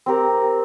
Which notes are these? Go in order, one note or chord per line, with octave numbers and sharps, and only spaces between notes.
C4 G4 A#4